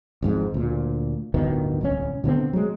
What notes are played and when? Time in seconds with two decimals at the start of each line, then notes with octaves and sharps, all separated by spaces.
0.22 G#1 F2 G#2
0.54 D2 A#2
1.34 D1 G1 B2 D#3
1.81 D1 C2 C#4
2.24 B2 D3 B3 C4
2.53 F#3 G#3